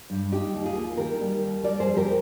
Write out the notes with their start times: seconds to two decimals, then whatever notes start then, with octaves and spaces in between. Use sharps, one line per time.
0.10 G2
0.32 G3 D#4 G4
0.53 D#2
0.65 F4 G#4
0.75 A#3
0.97 D#3 G4 A#4
1.21 G3
1.42 D#2
1.63 G3 A#4 D5
1.80 G#4 C5
1.87 F2
1.97 G4 A#4